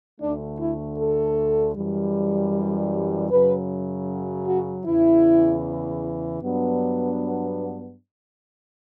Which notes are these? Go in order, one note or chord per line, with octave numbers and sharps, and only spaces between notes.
D2 D3 A3 D4
E4
A4
F#2 E3 G3
F#2 C#3 F#3 B4
F#4
E2 C#3 E3 E4
G2 F#3 B3 D4